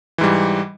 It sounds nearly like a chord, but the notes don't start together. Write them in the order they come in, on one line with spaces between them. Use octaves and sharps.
E3 G#2 G3